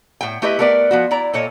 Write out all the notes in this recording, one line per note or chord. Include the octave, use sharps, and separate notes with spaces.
A2 G5
A3 E4 G4 B4 D#5
A3 B3 A#4 B4 D5
F3 B3 F#4
E4 D5 A#5
A#2 A4 C#5 D#5